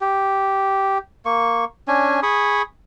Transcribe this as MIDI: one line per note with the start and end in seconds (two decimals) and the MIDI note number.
0.01 0.98 67
1.25 1.65 58
1.25 1.65 85
1.88 2.20 61
1.88 2.20 62
1.88 2.20 80
2.23 2.62 68
2.23 2.62 83
2.23 2.62 85
2.23 2.62 87